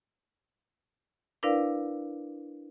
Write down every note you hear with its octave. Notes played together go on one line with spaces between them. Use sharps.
D4 E4 A#4 B4 D5 F5